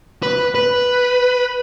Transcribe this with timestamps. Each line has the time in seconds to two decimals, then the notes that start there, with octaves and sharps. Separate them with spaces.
0.23 B4
0.55 B4